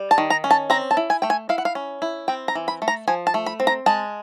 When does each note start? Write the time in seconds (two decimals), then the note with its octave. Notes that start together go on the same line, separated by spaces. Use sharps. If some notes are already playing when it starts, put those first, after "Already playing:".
Already playing: G3
0.11 A5
0.18 D#3
0.30 A#5
0.44 C#4
0.51 A5
0.70 C4 A#5
0.91 A5
0.97 E4
1.10 G#5
1.22 A3 G5
1.30 G#5
1.49 E4 F5
1.58 F#5
1.65 F5
1.75 C#4
2.02 E4
2.28 C4 G5
2.48 A#5
2.55 E3
2.68 B5
2.82 A3
2.88 A#5
3.08 F3 G#5
3.27 A5
3.34 A3
3.46 B5
3.60 C4
3.67 A#5
3.86 G#3 A5